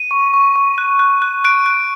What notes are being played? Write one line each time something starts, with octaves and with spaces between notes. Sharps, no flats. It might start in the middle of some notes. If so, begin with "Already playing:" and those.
Already playing: D#7
C#6
C#6
C#6
F#6
F#6
F#6
F#6 D7
F#6